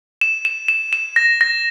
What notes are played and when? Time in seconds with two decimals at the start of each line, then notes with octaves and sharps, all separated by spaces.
0.21 E7
0.45 E7
0.68 E7
0.93 E7
1.16 A#6
1.41 A#6